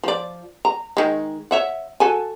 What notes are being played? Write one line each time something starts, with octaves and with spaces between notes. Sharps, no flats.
F3 D5
A#5
D#3 G#3
C#5 E5 F#5
F#4 A4 G#5